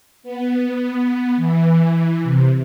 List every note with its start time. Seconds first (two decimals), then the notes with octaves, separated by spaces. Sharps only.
0.23 B3
1.36 E3
2.23 C3